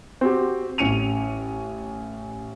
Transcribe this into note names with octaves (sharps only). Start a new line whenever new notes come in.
C4 F#4 G4
A1 C#4 C#7 D#7 F7